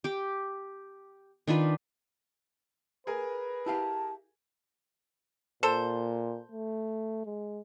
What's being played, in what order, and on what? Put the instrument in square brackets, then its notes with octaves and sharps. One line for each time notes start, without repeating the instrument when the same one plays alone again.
[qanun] G4 D6
D#3 D4 F4 B4
[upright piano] G#4 A#4 G#5 [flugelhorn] B4
[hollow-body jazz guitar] E4 G4 F5 [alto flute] A5
[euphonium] A#2 [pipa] A4 C5
[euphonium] A3
G#3